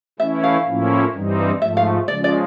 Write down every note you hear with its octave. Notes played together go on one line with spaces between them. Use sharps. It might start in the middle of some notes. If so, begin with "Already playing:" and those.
E3 A3 C#4 E4 E5
F5
A2 F3 A#3 C#4 E4
G2 E3 G3 C4 D#4
G#2 F3 A3 E5
F5
C#3 F3 G#3 D5
D5